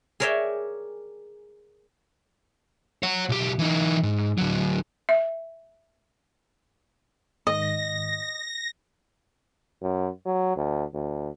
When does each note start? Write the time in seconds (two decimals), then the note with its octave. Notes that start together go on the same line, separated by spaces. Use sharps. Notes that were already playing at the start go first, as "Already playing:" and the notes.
0.20 G#4 A#4 C#5 D5 E5 G5
3.03 C#5 F#5
3.29 B1 G4
3.59 E3 D#4
4.03 G#2
4.38 D2 F#3
5.09 E5
7.47 G#2 D#3 D#5 A#6
9.82 F#2
10.26 F#3
10.57 D2
10.94 D2